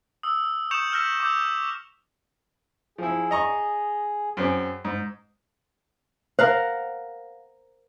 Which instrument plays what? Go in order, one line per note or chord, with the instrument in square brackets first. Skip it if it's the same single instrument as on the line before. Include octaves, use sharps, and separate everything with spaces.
[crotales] D#6 E6
C#6 D#6 G6 C#7 E7 F7
E6 F6 G6 A#6 B6 C#7
C#6 D6 E6 G6
[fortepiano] F3 E4 [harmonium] G#4
[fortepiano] D#5 A#5 C#6
F#2 C4 G#4
G#2
[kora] A#4 F5 F#5 [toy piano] C5